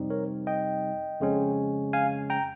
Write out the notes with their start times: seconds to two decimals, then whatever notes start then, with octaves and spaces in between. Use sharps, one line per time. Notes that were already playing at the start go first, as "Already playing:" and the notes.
Already playing: F2 C3 G3 C4 D#4
0.10 A#4 C#5
0.47 D#5 G5
1.20 F2 C#3 G#3 C#4
1.93 F5 G#5
2.30 G5 A#5